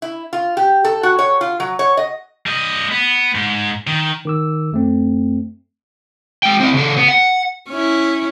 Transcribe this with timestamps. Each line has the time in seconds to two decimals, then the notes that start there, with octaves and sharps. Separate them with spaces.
0.02 E4
0.33 F4
0.57 G4
0.85 A4
1.03 F#4
1.19 C#5
1.41 F4
1.60 F#3
1.79 C#5
1.97 D#5
2.46 G3 D#5
2.92 B3
3.35 G#2
3.87 D#3
4.25 D#3 D6 E6
4.72 F#2 A3 C4
6.43 G#3 G5
6.60 C4 E4
6.74 C#3 A4
6.97 B3
7.08 F#5
7.70 C#4 E4